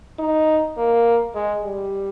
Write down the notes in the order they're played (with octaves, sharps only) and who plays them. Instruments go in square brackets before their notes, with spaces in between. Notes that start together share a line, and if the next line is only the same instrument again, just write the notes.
[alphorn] D#4
A#3
G#3
G3